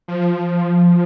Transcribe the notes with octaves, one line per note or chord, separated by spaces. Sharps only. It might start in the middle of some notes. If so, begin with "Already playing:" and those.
F3